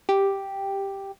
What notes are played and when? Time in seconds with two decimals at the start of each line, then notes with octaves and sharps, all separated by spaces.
0.09 G4